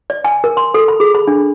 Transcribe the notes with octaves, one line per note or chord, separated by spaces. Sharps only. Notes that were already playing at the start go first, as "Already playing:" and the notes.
D5
G#5
A#4
C6
A4
B5
G#4
B5
D4